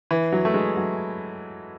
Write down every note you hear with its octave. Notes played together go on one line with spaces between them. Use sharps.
E3
F#3
A3
G#3
F#3